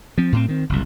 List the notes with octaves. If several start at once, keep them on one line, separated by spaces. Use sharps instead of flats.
F3 C4
A2 C4
D#3 C4
F#1 C2